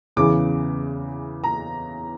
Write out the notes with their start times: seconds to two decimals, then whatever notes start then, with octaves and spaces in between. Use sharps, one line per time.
0.16 E2 C#3 E3 D6
1.44 A#5